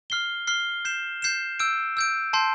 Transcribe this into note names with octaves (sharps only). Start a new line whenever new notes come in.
F6 C7 G7
F6 C7 G7
G6 C7 E7
G6 C7 E7
E6 G6 D7
E6 G6 D7
A5 C6 G6 C7